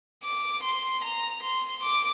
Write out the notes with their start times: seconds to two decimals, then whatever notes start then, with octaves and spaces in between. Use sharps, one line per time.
0.23 D6
0.63 C6
1.03 A#5
1.43 C6
1.82 D6